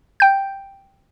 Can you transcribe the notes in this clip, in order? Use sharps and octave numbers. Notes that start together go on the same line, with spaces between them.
G5 G6